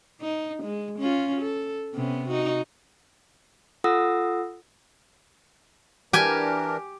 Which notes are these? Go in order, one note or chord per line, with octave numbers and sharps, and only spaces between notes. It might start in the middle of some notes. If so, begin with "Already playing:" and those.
D#4
G#3
C#4 F4
A4
C3 B3 C#4
D#4 F#4
F4 A4 F#5 D#6 E6 A#6
E3 D4 G4 A#4 G#5